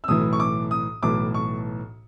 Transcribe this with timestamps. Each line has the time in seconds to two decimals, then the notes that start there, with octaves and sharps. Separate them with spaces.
0.04 E6
0.08 B1 A2 E3 D#6
0.33 C#6
0.40 D6
0.71 D#6
1.03 B1 A2 E3 D6
1.34 C#6